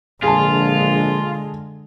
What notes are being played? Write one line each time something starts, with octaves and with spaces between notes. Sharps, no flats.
A#1 D3 G#3 F4 G#4 A5